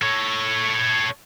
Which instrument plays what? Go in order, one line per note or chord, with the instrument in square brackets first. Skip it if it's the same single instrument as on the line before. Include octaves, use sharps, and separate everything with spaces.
[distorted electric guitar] A4 C#5